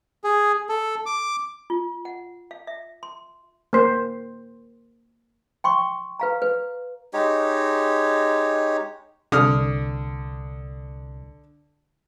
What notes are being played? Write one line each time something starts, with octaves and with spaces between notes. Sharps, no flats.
G#4
A4
D6
F4
F#5
F5
E5
C6
A#3 C5
G5 C6 C#6
B4 F5 A#5
B4
G#3 D#4 G4 C#5
C2 D3 D#6 F6